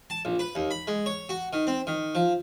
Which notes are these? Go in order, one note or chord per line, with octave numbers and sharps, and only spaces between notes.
A5
A#1
B4
D#2
B5
G#3
C#5
F#4
D#3
C4
D#3
F3